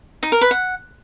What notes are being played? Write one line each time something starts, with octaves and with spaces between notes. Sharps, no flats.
D#4
A#4
B4
F#5